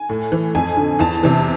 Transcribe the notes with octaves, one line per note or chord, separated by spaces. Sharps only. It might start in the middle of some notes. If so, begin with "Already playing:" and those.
Already playing: G#5
A2
E3
F2 G#5
D3
E2 A5
C3 E3